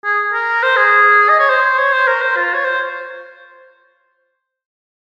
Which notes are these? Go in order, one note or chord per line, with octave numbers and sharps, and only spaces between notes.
G#4
A#4
C5
G#4
D#5
C#5
C5
C#5
C5
A#4
C5
F4
C#5
C5